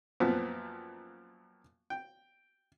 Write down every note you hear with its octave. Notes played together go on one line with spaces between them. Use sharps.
F#2 A#2 F3 B3 C4
G5